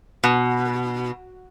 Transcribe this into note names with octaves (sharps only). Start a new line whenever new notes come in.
B2